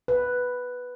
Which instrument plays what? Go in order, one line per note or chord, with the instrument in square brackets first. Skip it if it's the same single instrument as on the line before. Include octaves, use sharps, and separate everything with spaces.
[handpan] B4